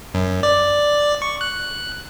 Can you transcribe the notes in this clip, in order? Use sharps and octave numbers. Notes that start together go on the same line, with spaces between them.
F#2
D5
C#6
F#6